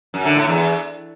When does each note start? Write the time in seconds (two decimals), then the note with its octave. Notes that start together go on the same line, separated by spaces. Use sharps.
0.14 F#2
0.25 D3
0.36 A2
0.47 E2